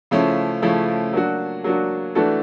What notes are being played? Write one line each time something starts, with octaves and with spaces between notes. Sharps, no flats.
C#3 F3 A3 C#4 E4
C#3 F3 A3 C#4 E4
F#3 A#3 D4 F#4
F#3 A#3 D4 F#4
E3 A3 D4 F#4 A4